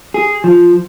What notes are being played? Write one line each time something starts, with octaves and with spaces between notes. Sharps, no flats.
G#4
F3